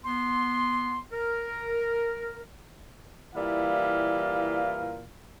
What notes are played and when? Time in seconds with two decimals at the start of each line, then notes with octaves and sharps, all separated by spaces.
0.05 B3 C6
1.12 A#4
3.35 A#2 E3 G3 E4 F5